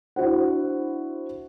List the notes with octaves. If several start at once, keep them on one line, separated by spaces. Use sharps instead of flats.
D4 E4 F#4 C5 F#5